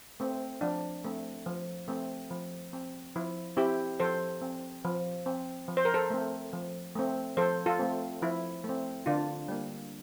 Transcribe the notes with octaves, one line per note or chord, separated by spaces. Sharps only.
A3 C4
F3 D4
A3 C4
F3
A3 C4
F3
C4
F3 E4
C4 E4 G4
F3 A4 C5
C4
F3
C4
F3
C5
A#4
A4 C5
A3 C4
F3
A3 C4
F3 A4 C5
F4 A4
A3 C4
F3 E4
A3 C4
D3 D4 F4
G3 A#3